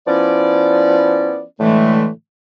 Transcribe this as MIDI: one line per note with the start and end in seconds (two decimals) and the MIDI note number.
0.07 1.43 53
0.07 1.43 59
0.07 1.43 61
0.07 1.43 64
0.07 1.43 74
1.60 2.09 45
1.60 2.09 50
1.60 2.09 52
1.60 2.09 56
1.60 2.09 57